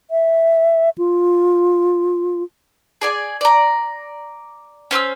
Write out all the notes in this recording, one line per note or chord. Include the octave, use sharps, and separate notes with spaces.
E5
F4
G#4 D5 G#5
D5 A#5
C#4 C5 D6 E6